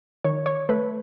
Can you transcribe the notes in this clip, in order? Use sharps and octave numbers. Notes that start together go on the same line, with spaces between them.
D#3 C#5
C#5
A3 B4